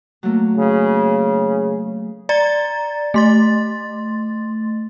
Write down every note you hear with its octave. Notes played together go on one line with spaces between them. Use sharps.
F#3 A3 A#3
C#3
D5 A#5 A6
A3 C6 A6